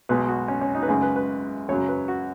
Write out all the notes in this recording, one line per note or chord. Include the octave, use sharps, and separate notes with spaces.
B1 B2 G#3 B4
F#4
C#4
C#4
D#4
B4
F#2 C#3 G#3 G#4
B4
B4
F#2 C#3 F#3 C#5
B4
F#4